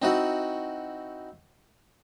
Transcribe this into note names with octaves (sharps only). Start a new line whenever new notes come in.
C4 D#4 E4 F#4